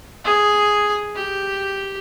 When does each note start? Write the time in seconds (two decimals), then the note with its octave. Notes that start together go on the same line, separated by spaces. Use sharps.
0.24 G#4
1.16 G4